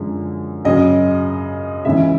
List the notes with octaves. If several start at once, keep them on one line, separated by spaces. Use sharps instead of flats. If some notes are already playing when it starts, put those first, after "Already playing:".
Already playing: F#2 D3 F3 G#3
F#2 C#3 F#3 D#5
C#2 C#3 E3 E5